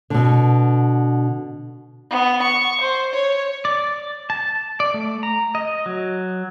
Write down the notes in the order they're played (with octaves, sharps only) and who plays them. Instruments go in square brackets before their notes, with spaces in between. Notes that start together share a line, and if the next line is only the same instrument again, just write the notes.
[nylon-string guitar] B2 D3
[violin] B3
C#6
C5
C#5
[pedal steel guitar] D5
A5
D5
A3
A#5
D#5
F#3